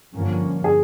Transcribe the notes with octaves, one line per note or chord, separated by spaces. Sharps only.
G2 D3 F3 A#3 C#4
G#4